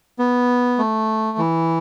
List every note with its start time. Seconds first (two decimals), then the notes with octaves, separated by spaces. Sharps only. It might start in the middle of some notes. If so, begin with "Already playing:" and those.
0.19 B3
0.79 A3
1.38 E3